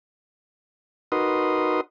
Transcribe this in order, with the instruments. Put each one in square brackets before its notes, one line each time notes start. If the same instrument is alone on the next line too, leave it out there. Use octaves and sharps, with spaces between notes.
[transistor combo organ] D#4 F#4 A#4 B4 C6 D#6